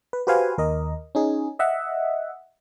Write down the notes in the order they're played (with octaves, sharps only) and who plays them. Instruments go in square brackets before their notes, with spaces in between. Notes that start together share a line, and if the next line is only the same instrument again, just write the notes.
[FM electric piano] B4
F#4 G4 B4 C5 F5 G#5
D#2 A#4 D#5
C#4 D#4 G#4
D#5 E5 F#5